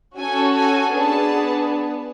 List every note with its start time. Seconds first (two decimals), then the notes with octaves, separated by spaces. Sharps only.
0.16 C#4 F#4 A4 G#5
0.55 G#5
0.94 B3 D4 G#4 A5